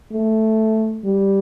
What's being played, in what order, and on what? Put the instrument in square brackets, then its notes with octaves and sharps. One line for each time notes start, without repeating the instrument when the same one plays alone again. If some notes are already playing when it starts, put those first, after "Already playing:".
[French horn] A3
G3